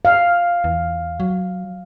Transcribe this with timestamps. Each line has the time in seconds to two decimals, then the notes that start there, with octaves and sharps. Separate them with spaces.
0.05 F5
0.64 E2
1.20 F#3